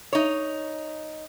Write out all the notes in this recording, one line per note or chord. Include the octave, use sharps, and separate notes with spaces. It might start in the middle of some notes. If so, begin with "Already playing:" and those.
D#4 C#5